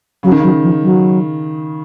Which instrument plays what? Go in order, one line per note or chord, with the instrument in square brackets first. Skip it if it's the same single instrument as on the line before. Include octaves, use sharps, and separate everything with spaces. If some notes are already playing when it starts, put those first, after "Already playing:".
[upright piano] C#3 [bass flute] F#3
[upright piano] D#3
[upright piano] C#3 [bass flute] F#3
[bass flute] F3
F#3